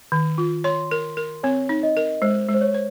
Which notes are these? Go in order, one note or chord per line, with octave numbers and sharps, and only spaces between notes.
D#3
F4
C#5 C6
A#4
A#4
C4 C#5
D#4
D#5
A#4
G#3 C5
G#3
C5
C#5
C5